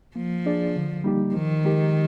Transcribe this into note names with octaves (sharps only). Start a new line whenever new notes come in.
F3 A#3
D4 G#4 D5
D3
G3 A#3 D#4 G4
D#3 F3
G#3 D#4 G4 A#4